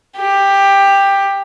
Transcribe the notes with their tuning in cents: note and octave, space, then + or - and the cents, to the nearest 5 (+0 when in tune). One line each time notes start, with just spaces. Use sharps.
G4 +10